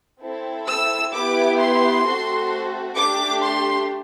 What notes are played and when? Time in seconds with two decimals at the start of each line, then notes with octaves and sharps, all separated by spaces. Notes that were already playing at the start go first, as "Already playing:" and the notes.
0.22 C4 E4 A4
0.67 E6
1.13 B3 E4 G4 D6
1.59 C6
2.04 A3 C4 F#4 A4
2.95 A3 D4 G4 D6
3.42 C6